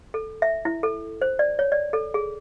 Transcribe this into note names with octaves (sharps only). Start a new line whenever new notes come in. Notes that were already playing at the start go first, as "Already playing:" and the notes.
A4
E5
E4
A4
C5
D5
C#5
D5
A4
G#4